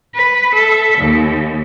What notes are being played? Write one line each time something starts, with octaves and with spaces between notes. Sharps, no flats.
B4
A4 E5
D#2